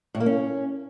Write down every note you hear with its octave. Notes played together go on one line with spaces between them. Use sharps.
A2
A#3
C#4